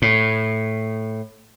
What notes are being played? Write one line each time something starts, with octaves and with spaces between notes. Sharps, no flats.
A2